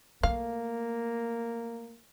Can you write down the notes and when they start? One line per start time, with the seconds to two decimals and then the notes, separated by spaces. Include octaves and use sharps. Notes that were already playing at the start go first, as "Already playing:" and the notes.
0.23 A3 A#3 F5